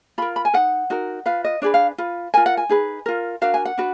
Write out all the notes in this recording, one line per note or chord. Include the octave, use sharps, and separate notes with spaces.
F4 A#4 B5
B5
G#5
D#4 A#4 F#5
D#4 F#4 A#4
F4 B4 F5
D#5
D4 G#4 B4 D5
F5
F4 B4
F4 A#4 G#5
F#5
G#5
D#4 G#4 B4
F4 A#4
D4 F#4 A#4 F5
G#5
F#5
D4 F#4 B4